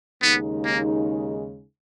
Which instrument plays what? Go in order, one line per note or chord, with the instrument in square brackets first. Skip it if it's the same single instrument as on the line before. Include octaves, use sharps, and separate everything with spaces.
[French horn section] D#2 C#3 G#3 D#4 [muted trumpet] B3
[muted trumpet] A#3